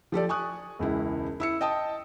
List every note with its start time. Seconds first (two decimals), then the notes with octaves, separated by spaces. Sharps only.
0.12 F3 G4 A4 D5
0.29 G#5 C#6 D#6 F#6
0.79 E1 C#2 E4
1.40 E4 E6 C#7
1.61 D#5 G5 A5 D#6